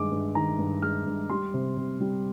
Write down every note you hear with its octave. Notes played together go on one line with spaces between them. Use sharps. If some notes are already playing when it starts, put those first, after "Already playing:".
Already playing: G2 D#3 G#3 D6
G2
D#3 A#5
G2
G#3 F6
G2
G3 C6
C3
C3
G3